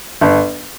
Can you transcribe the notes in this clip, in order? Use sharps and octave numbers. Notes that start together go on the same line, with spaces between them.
G1